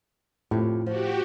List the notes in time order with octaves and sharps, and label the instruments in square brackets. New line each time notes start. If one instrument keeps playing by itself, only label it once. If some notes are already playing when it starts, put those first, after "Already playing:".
[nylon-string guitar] F2 A3 G4 [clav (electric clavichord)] A2
[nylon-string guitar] F3 [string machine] F#4 G4